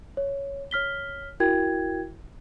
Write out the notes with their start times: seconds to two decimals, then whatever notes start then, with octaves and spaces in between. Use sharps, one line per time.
0.17 C#5
0.71 C#5 F6 B6 G7
1.40 E4 F#4 A#4 G5 G#6